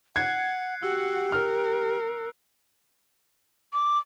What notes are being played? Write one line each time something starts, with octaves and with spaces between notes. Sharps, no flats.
F#5 F#6 G#6 C7 C#7
F#4 G4 F#5 E6
A#4 F6
D6